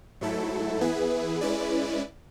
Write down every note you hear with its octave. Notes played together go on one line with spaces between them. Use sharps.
G#2 F#3 A3 E4 A4
E3 B3 E4 G#4 B4
G#3 C#4 E4 B4 D5